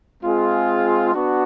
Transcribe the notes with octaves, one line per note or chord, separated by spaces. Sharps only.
G#3 C4 F4 G#4
B3 D4 F#4